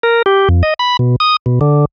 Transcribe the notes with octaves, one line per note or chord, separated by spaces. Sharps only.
A#4
G4
F2
D#5
B5
B2
D#6
B2
D3